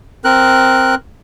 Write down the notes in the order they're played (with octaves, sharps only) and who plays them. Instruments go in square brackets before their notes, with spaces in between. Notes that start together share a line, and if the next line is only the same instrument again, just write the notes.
[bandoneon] C4 A#4 F#6